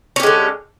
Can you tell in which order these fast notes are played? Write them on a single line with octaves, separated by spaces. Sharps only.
C#4 G4 G#3 D3